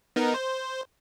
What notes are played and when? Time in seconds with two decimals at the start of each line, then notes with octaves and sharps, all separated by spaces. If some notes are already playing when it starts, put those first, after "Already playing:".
0.16 B3 D#4 A#4
0.34 C5